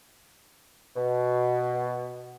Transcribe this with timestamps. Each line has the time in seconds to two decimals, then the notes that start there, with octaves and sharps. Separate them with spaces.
0.96 B2